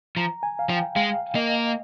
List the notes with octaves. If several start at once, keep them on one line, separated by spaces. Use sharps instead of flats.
F3 A#5
G#5
F5
F3 G5
G#3 F5
A#3 D#5